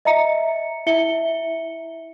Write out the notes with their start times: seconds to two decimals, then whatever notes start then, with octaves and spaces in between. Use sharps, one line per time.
0.05 D#5 E5 A#5 C#7
0.87 E4 E5 C#7 G7